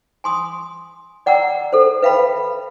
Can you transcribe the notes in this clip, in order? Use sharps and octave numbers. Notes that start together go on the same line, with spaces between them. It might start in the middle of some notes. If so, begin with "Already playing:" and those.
G#5 C6 D#6
D5 F#5 G5 A#5 E6
A4 A#4 C5
B4 E5 F5 G5 A5 B5